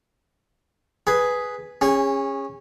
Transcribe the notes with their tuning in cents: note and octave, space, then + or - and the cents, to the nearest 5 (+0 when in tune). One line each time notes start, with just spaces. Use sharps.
G#4 +5 B4 +0
C#4 -10 G#4 -30